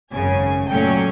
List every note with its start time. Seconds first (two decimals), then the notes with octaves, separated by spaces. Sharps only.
0.12 G#1 F#2 C#3 G#5
0.70 A#2 F#3 A3 C#4 G5